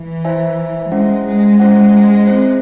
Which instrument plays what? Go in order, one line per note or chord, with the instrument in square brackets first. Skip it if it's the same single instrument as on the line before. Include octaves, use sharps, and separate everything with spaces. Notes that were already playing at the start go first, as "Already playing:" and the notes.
Already playing: [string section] E3
[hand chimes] E4 C5 E5 G#5
[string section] G#3 [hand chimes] C#4 E4 C5 F#5
[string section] G#3
[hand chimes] C#4 E4 C5 F#5
C4 E4 C5